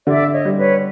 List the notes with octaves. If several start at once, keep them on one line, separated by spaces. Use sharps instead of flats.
D3 D5 E5
C#5 D#5
G3
B4 C#5